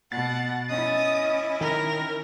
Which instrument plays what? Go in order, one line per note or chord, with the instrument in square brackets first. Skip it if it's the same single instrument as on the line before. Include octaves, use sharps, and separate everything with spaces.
[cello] B2 [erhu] F#5 [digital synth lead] A6
[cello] C#4 E4 [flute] D#5 [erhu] D#6
[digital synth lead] D#3 [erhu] A#4